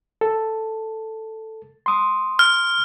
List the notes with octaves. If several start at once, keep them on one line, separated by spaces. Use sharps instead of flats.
A4
C6 D#6
F6